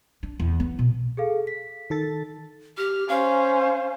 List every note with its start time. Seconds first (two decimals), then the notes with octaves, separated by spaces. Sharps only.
0.23 D4
0.40 E2
0.60 B3
0.79 B2
1.17 G#4 A4 F5
1.47 B6
1.90 D#3 A4 A6
2.78 G4 F6
3.08 C#4 C5 F5